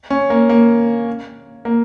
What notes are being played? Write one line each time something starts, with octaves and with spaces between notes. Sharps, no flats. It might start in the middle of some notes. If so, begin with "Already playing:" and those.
C#4
A#3
A#3
A#3